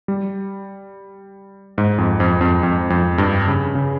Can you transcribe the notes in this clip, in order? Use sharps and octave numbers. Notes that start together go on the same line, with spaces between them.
G3
G#2
F2
F2
F2
F2
F2
G2
C#3
C#3